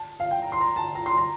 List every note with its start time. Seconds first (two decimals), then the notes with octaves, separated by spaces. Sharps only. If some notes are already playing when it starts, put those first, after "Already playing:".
Already playing: A5
0.20 F5
0.31 G5
0.42 A#5
0.52 C6
0.61 A#5
0.76 A5
0.95 A#5
1.06 C6
1.17 A#5